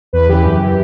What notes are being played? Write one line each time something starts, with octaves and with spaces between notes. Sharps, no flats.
E2 B4
C#3 E3 G4
F#2
E3